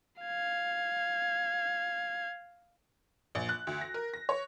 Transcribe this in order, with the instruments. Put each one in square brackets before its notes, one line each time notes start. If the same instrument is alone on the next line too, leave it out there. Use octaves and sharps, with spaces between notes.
[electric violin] F5 G#6
[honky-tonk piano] A#1
F#6
D2
A#6
A#4
A#6
C#5